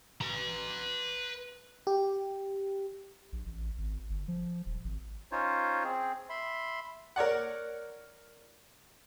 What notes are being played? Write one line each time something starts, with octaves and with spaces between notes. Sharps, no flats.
B4 A#5
G4
A#1
A1
G#1
G1
F3
D#1
G#1
C#4 D#4 F4 C5 C#5
C4 G#4
E5 B5 C6
A#4 C#5 D5 F#5